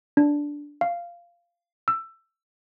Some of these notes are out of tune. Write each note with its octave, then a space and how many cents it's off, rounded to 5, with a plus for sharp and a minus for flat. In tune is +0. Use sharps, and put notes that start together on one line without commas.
D4 -5
F5 -10
E6 +15